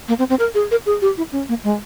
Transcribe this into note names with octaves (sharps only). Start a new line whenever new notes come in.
A#3
C4
C4
A#4
G#4
A#4
G#4
G4
E4
C#4
A#3
G#3